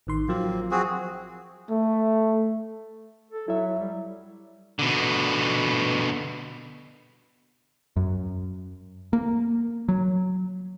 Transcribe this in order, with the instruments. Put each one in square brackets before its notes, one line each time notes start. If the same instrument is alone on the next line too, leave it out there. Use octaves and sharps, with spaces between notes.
[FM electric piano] A1 D#3 C6
[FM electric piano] F3 F#3 F4 [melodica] A#3 C4
[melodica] C4 F#4 G#4
[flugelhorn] A3
[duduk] A4
[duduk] F#3 [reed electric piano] E4 E5
[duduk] G3
[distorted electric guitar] B2 D3
[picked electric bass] F#2
A#3
F#3